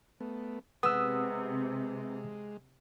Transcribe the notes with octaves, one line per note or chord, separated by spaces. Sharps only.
A3 B3
C3 G#3 B3 D#6 E6